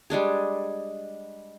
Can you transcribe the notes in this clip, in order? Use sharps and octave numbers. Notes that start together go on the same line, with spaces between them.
G3 G#3 D4 G#4